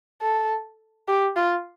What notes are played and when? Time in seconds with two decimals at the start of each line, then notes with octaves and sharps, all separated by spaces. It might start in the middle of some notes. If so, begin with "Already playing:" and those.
0.22 A4
1.08 G4
1.37 F4